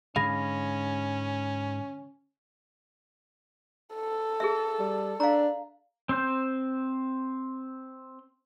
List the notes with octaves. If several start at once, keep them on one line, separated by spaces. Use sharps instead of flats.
G#2 D3 G#3 C#4 G#4 F5 B5 A#6
A4
G#4 A#4 E5
G3
D4 F5 A#5
C4 C5 G6